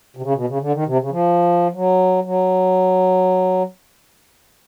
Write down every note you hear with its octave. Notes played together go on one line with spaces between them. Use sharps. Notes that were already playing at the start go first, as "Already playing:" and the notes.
C3
C#3
B2
C#3
D3
D#3
C3
C#3
F3
F#3
F#3